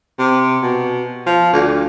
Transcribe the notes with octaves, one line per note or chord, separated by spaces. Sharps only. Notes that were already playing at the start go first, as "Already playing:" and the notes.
C3
B2
F3
D2